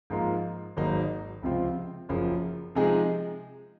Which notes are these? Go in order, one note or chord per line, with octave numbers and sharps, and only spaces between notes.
G#2 F3 A#3 F4
G#1 G#2 F#3 A#3 D#4
C#2 C3 F3 C4 F4
F#1 F#2 C#3 F3
C3 F3 G#3 D#4 G#4